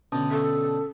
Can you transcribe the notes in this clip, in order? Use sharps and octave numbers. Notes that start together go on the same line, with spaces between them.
B1 D3 C#4 A5 D#6
A4